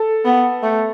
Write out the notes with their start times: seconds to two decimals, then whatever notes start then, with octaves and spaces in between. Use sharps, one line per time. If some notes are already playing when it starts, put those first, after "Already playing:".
Already playing: A4
0.25 B3
0.63 A3